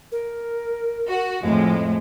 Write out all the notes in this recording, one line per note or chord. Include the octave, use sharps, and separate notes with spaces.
A#4
F#4
F2 A2 G#3